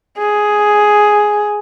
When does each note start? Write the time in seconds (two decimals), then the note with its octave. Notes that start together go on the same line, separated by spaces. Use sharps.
0.18 G#4